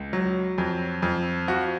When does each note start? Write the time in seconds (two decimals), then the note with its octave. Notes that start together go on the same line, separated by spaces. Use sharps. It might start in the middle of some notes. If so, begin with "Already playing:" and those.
Already playing: C#2
0.13 F#3
0.58 F2
1.02 F2
1.48 F3 F#4